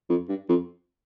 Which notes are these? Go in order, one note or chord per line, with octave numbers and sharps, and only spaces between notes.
F2
G2
F2